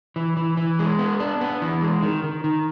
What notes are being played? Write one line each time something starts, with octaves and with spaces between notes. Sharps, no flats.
E3
E3
E3
G#3
B3
D4
B3
E3
G#3
D#3
D#3
D#3